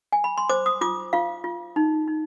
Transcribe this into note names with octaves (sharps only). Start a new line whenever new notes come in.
G#5
B5
C6
C5 D6
D#6
F4 D6
F4 F5
F4
D#4
D#4